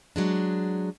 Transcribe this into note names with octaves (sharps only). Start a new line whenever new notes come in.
F#3 G#3 D4